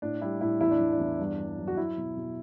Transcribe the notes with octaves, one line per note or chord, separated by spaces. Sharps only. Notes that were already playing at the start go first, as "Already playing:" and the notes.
A2 D4
G3 E4
A2 E4
E2 E4
D4
E2
D4
E2
G2
G2
F#3
F#4
F#3 E4
B2
B2